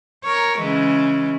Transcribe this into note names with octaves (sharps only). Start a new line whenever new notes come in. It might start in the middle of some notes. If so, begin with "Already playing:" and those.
A#4 C#5
C#3 E3 G#3